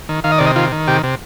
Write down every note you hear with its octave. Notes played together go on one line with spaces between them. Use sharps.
D#3
D#3 F5
D#5
C3 D5
D#5
D#3 F4
D#3
C3 G4
C3